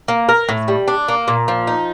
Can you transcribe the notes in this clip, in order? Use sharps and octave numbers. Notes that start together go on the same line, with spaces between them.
A#3
A#4
A2
G3
D4
A#3
A#2
F3
D#4